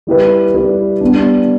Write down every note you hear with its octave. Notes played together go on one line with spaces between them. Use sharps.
G3 E4 G4 B4
G3 E4 G4 B4
G3 B3 D4